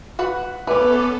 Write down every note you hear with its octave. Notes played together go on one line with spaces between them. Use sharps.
F#4 B4 F#5
A3 B3 C#4 A4 B4 G#5 D6